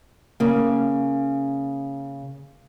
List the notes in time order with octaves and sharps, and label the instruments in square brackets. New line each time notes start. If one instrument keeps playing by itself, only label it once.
[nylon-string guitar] C#3 A#3